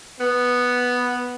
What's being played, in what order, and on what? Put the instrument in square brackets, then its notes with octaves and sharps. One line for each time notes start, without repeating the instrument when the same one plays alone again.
[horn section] B3